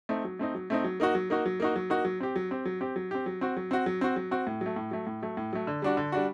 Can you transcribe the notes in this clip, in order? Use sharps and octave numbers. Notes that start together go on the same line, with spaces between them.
A3 C4 D#4
F#3
A3 C4 D#4
F#3
A3 C4 D#4
F#3
A#3 D#4 F#4
F#3
A#3 D#4 F#4
F#3
A#3 D#4 F#4
F#3
A#3 D#4 F#4
F#3
C4 G4
F#3
C4 G4
F#3
C4 G4
F#3
C4 G4
F#3
C4 F#4
F#3
C4 F#4
F#3
C4 F#4
F#3
C4 F#4
A2
F#3 A3
A2
F#3 A3
A2
F#3 A3
A2
F#3 A3
D3
G3 D4 F#4
D3
G3 D4 F#4